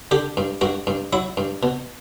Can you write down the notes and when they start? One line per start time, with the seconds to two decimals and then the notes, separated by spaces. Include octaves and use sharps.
0.11 D3 G4
0.37 G2
0.61 G2 F#4
0.87 G2
1.13 F#3 E4
1.37 G2
1.63 B2